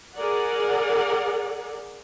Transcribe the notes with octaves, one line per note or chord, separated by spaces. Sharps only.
G#4 A#4 D5 F#5